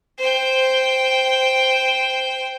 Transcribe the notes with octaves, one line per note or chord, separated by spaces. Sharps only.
C5 G5